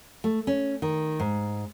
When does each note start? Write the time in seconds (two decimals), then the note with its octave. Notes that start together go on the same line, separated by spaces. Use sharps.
0.24 A3
0.47 C#4
0.82 D#3
1.20 G#2